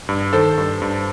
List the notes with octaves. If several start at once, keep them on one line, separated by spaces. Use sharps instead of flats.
G2
D#3 A4 C5
G2
G2